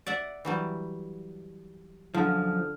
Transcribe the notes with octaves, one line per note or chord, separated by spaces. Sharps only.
D5 E5 F#5
E3 F#3 G3
F#2 D3 F3 A4 D#6 F6